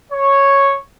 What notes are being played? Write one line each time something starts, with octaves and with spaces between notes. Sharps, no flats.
C#5